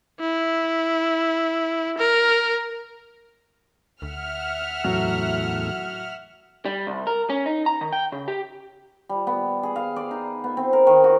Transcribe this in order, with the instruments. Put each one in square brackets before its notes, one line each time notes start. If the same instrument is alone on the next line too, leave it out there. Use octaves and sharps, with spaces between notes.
[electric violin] E4
A#4
[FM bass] D2 [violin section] E5 F#5 F6
[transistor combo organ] E2 A2 [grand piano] F#3
[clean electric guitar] G3
C2
A#4
C#4
D#4
A#5
D#3
G5
C#3
G4
[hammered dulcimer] G3
B3
G#4
F5
D5
D#4
B3
C4
A#4
D#3
F#4